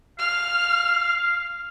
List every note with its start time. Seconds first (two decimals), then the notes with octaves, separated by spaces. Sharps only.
0.19 F5 F6